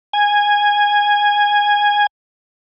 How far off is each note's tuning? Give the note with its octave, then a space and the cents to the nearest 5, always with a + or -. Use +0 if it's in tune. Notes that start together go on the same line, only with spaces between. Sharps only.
G#5 -10